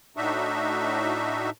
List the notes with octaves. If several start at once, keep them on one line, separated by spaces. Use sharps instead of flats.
A2 D4 D#4 F#4 E5